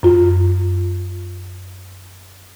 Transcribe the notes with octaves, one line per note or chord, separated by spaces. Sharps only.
F#2 F4